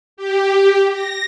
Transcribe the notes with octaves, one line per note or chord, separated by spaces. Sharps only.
G4
A#6